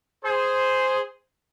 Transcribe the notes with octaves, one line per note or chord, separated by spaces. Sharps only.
G#4 C5